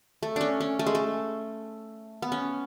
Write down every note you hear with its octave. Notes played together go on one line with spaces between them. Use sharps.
A3
C#4 D4
C#4
A3
G#3
A3
B3
C#4